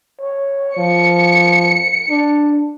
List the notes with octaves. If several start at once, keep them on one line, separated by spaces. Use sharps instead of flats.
C#5
F3 C#7
D4